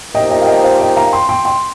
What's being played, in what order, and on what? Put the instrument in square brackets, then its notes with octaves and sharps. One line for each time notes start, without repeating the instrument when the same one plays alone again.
[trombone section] A#2 F3 D#4 G4 A#4 [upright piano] D#5 G5
[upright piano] D#5 G5
F5
D#5 G5
C5 F5
D#5 G5
F5 A#5
G5 C6
G5 C6
G5 C6